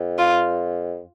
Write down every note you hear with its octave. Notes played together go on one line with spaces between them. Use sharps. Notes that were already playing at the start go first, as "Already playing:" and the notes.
Already playing: F2
F4